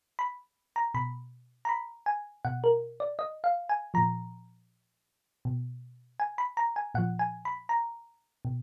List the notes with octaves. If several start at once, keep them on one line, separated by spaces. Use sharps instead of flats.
B5
A#5
B2 B5
A#5
B5
G#5
B2 F#5
A#4
D5
D#5
F5
G#5
A#2 F3 A#5
B2
G#5
B5
A#5
G#5
A#2 F3 F#5
G#5
B5
A#5
B2